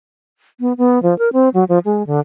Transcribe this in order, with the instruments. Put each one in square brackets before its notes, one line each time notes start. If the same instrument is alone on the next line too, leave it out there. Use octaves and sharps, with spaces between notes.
[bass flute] B3
B3
F3
A#4
C4
F#3
F3
G#3
D3